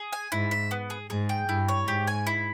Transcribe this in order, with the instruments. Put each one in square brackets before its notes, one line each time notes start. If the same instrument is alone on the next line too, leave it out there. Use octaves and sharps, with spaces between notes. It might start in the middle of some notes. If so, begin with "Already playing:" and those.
Already playing: [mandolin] G#4
G#5
[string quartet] G#2 [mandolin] E4
[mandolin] E5
B3
G#4
[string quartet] G#2 [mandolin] G#4
[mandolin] G5
[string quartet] G2 [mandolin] E4
[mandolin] C#5
[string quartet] G#2 [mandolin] G4
[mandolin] G#5
E4